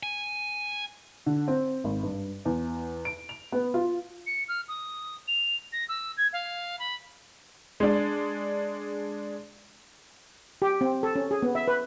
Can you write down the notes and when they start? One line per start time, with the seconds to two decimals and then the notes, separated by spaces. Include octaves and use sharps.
0.03 G#5
1.26 D3
1.48 C4
1.84 G#1
2.03 G2
2.45 E2
3.05 D7
3.29 F7
3.52 B3
3.74 F4
4.26 C#7
4.48 F6
4.68 D#6
5.28 F7
5.72 A#6
5.89 E6
6.17 G#6
6.33 F5
6.79 B5
7.80 G#3 D4
10.62 G4
10.81 C4
11.03 A4
11.16 C#4
11.31 G#4
11.43 B3
11.55 E5
11.68 B4